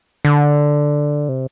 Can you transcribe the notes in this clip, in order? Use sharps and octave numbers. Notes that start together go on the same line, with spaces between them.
D3
C3